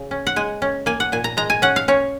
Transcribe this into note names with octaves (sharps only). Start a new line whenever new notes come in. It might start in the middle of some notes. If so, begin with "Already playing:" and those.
Already playing: C#3
C#4
F#5
G#3 G#5
C#4
A#3 G#5
F#5
A#2 G#5
A#5
G#3 A#5
G#5
C#4 F#5
F5
C#4 C#5